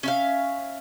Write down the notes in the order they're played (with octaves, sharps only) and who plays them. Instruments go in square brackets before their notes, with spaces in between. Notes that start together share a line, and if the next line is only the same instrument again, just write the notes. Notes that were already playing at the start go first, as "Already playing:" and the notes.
[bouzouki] C#4 E5 F5